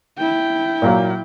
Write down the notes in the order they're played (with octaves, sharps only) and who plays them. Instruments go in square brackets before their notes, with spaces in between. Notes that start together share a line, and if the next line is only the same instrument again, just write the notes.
[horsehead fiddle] E4 G5
[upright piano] A#2 F#3 A#3